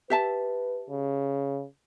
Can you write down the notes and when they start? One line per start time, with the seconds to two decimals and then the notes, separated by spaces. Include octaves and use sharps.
0.10 G4 B4 E5 A5
0.89 C#3